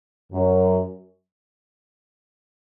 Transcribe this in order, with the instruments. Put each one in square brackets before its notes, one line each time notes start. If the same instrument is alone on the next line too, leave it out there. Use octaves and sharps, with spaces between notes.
[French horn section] F#2